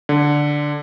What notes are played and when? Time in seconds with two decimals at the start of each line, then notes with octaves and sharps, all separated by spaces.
0.09 D3